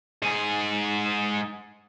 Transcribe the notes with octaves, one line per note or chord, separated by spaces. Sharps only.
G#2 G#4